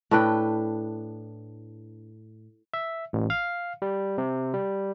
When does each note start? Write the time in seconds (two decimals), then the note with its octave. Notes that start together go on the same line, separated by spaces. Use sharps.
0.11 A2 D4 B4 G5
2.74 E5
3.13 A1
3.30 F5
3.82 G3
4.18 C3
4.54 G3